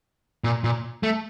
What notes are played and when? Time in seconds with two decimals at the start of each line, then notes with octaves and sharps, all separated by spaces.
0.44 A#2
0.64 A#2
1.03 A3